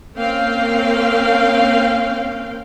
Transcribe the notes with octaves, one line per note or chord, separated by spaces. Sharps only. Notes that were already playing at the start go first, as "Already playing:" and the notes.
A#3 C4 C#4 F5 G5